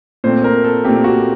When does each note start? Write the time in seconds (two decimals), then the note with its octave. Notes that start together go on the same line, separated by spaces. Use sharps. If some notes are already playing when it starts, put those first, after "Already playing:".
0.24 A#2 A3 C4 C5
0.44 A#4
0.64 A4
0.84 A#2 A3 C4 G4
1.04 F#4